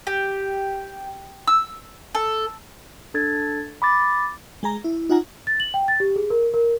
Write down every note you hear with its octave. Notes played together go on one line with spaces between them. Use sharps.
G4
E6
A4
D4 A4 G#6 A6
B5 D6 A6
G#3 G#4 A#5
E4
D#4 F4 F#5 G#5 A#5
A6
F#7
G5
A6
G4
G#4
A#4
A#4